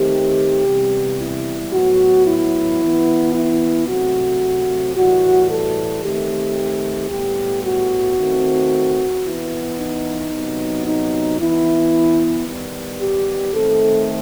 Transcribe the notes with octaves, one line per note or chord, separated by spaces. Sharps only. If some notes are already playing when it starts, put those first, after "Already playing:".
Already playing: D#3 A3 C4 G4
C3 E3 G3 B3
E4
A2 F#3 B3 F#4
E4
E3 B3
E4
C3 F#3 A3 C4 F#4
A2 E3 G3 F#4
A4
D#3 A3 C4 G4
A2 G3 B3 G4
F#4
D#3 A3 C4
E3 B3 E4
D#4
C3 F#3 B3
D#4
E3 B3 E4
D#3 G3 B3
G4
D#3 A3 C4 A4